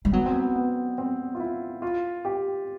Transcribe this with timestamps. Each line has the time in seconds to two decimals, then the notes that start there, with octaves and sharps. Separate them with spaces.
0.05 G3
0.13 F#3 B3
0.26 C4
0.40 B3
0.56 B3
0.98 C4
1.35 F4
1.40 E4
1.82 F4
2.25 G4